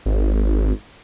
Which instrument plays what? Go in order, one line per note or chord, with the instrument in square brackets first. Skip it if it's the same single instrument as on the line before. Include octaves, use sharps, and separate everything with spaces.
[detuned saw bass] G#1